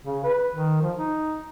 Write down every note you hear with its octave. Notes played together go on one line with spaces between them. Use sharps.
C#3
B4
D#3
F3
D#4